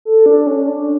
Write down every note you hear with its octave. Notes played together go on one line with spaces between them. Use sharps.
A4
D4
C#4
D4